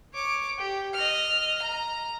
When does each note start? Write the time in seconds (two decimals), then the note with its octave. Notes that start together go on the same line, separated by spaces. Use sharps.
0.13 C#5 D6
0.58 G4
0.94 D#5 F6
1.62 A#5